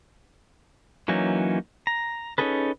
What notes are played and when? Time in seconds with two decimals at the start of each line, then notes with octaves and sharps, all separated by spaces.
1.08 E3 F#3 A#3 C#4 D#4
1.87 A#5
2.38 C#4 D#4 G#4 A4 B4